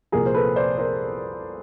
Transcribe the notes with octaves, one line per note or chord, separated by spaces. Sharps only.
C2 A#2 F3 G#4 A#4
C5
A4 B4
C5 D5
A#4 C5